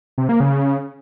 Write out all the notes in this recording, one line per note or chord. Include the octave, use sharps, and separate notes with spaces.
C3
A#3
C#3